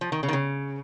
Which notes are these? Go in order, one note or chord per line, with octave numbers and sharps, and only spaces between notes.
F3
D#3
C#3
D#3
C#3